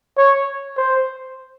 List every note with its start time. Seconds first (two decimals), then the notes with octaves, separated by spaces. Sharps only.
0.17 C#5
0.77 C5